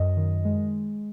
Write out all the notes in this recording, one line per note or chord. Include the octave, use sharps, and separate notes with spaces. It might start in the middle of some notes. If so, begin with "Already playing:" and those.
Already playing: F#2 D#5
D#3
G#3